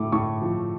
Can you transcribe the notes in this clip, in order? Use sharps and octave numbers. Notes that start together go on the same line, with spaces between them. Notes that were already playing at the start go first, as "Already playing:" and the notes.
Already playing: A2 A3 D6
A2 C#6
F3